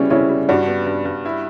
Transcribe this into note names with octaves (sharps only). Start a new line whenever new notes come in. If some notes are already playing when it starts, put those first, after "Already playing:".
Already playing: C#3 G3 B3 C#4 E4 F#4
C#3 C#4 E4
G3
G2 D4 F#4
B3
G2
G2
E4